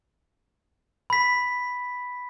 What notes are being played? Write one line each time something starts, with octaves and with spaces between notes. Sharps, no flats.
B5 B6